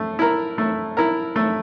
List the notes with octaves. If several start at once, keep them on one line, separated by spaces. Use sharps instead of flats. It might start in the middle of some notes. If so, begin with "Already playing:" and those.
Already playing: A3
E4 A#4
A3
E4 A#4
A3